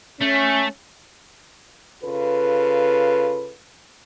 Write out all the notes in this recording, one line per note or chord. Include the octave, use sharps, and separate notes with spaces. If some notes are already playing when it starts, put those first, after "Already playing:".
A3 C#4
C#3 F4 A4 B4